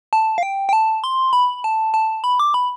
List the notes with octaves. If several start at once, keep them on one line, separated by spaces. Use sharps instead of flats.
A5
F5
G5
G5
A5
C6
B5
A5
A5
B5
D6
B5